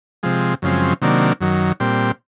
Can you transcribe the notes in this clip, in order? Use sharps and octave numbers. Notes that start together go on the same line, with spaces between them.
C3 F3 G#3
F#2 C#3 F3 G#3 C4
C3 D#3 F#3 A#3 D4
F#2 D#3 F#3
A#2 G3 C4